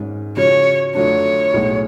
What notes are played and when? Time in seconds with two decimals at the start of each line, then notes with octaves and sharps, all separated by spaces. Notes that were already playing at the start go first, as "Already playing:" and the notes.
Already playing: G#1 G#2 G#3 C#4
0.37 C#3 F3 G#3 C#4 F#4 C#5
0.95 F2 D3 F#3 A3 D4 C#5
1.53 B1 A2 G#3